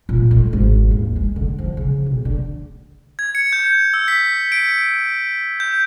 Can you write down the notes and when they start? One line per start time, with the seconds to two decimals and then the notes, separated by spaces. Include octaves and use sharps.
0.09 A#2
0.31 A3
0.53 G#1
0.91 D#2
1.16 G#3
1.36 D3
1.59 F3
1.77 C#3
2.06 B1
2.25 D3
3.19 G#6
3.35 C#7
3.53 G6
3.94 E6
4.08 B6
4.52 D7
5.60 G6